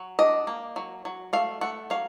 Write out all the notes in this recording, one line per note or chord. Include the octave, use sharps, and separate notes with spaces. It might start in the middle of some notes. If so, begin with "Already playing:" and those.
Already playing: F#3
D4 D#5
A#3
F#3
F#3
A3 F5
A3 F#5
F#3 F5